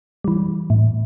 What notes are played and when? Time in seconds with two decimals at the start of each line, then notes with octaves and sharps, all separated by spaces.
0.24 E3 G3
0.70 A2